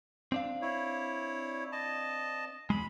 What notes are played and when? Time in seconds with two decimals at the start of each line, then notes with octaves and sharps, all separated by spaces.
0.32 C4 D4 F5
0.62 E4 C#5
1.72 D#5 A5
2.70 E2 G#3 B5